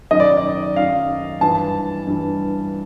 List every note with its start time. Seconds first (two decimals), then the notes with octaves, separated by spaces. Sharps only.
0.11 F#2 D#3 D#5
0.20 D5
0.37 D5
0.76 F#2 D#3 F5
1.41 G2 E3 A5
2.07 G2 E3